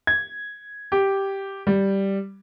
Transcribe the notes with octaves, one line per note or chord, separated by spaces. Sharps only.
G#6
G4
G3